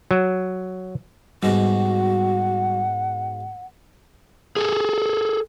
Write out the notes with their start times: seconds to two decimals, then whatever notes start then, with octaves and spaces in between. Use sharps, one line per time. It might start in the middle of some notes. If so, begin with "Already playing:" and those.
0.11 F#3
1.43 G#2 B2 G3 F#4 F#5
4.56 G#4 A4